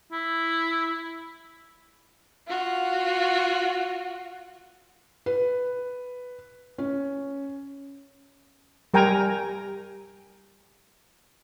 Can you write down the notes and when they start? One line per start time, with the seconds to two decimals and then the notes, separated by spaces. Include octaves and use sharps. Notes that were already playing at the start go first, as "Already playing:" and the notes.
0.12 E4
2.47 F4 F#4
5.26 B4
6.78 C#4
8.94 G3 A#4 G5 G#5 A#5